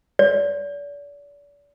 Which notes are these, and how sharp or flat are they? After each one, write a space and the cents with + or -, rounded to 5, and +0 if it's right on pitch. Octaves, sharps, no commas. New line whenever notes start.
D5 -40